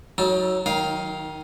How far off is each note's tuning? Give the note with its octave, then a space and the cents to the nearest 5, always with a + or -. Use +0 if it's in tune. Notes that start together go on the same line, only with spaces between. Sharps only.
F#3 +0 D#4 +35 A4 +0
D#3 +0 D#4 +35 F5 +0